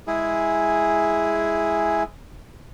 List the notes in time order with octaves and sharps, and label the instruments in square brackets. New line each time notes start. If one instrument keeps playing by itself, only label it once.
[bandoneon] G#3 E4 G#4